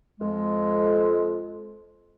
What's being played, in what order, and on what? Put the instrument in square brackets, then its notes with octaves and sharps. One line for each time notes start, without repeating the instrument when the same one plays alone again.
[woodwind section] F2 G#3